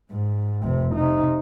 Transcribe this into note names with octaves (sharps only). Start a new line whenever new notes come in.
G#2
F1 C3
C3 D#4